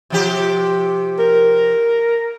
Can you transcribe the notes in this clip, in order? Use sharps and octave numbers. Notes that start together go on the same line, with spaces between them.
C3 F3 G4
A#4